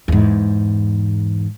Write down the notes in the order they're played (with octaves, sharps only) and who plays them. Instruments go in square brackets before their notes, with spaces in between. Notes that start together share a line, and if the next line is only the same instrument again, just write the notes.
[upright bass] E2 G#2